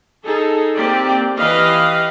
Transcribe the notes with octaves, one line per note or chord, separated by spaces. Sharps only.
D#4 G#4 A4
A#3 C4 G4 D5
E3 G4 B4 D#5 F5